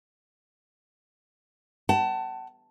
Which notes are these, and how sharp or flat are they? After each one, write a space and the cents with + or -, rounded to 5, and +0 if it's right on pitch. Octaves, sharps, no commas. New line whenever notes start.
F#5 +45 A5 +10